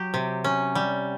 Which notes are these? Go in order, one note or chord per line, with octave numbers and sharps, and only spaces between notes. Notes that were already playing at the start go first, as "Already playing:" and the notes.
Already playing: F#3 G4
C3
C#4
G3